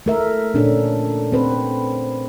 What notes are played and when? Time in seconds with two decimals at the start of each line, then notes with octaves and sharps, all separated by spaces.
0.06 A3 A#4 E5
0.54 A#2 C#4 D4 A4
1.32 C4 B4 C5